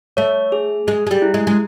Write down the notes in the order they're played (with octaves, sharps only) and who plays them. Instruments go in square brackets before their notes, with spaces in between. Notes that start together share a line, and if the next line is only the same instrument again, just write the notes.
[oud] A3 [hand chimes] C#5
[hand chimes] G#4
[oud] G#3 [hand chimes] G#4
[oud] G#3
G3
[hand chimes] E4
[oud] G#3
G#3